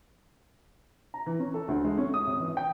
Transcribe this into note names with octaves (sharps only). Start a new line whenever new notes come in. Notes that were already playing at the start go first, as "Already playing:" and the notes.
A#5
E3
C#4
A4
D2
G#3
C#4
D#6
G#1
E3
G5